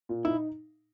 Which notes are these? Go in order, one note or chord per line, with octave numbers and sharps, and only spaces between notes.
A#2
D#4 E4